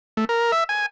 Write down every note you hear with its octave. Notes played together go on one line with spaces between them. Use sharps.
A3
A#4
E5
G#5